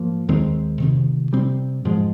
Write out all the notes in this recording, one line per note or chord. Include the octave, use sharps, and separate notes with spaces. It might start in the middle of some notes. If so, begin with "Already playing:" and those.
Already playing: G#2 F3 A#3
D#2 D#3 G#3 C4
D2 C3 D#3
C3 G3 C4
G#2 F3 G#3